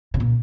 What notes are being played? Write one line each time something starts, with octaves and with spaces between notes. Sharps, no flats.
C3
A#2